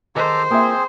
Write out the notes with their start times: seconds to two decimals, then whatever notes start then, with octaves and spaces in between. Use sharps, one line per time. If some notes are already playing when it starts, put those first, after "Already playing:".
0.16 D#3 G#4 A4 C5 A#5 D6
0.50 A#3 C4 F4 G#4 E5